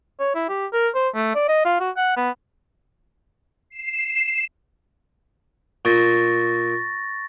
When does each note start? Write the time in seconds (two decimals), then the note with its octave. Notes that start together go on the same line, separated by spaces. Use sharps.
0.20 C#5
0.35 E4
0.49 G4
0.73 A#4
0.95 C5
1.15 A3
1.35 D5
1.48 D#5
1.65 F4
1.80 F#4
1.97 F#5
2.17 B3
3.70 C7 E7
5.85 A#2 C#6 A6 A#6